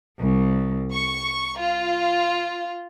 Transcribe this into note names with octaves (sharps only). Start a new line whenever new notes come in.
C2
C#6
F4